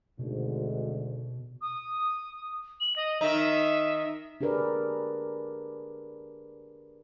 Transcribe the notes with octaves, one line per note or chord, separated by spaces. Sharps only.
G#1 D2 G#2 B2
D#6
F#7
D#5
D#3 D#4 E5
D4 G4 G#4 A#4 B4 D5